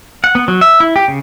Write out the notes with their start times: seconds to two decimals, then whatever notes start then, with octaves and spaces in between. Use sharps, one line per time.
0.24 F#5
0.35 B3
0.48 F#3
0.61 E5
0.80 E4
0.96 G4
1.08 C#3